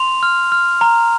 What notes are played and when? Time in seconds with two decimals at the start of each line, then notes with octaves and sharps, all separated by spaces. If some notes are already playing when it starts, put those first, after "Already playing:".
Already playing: C6 F7
0.23 F6
0.52 F6
0.81 A#5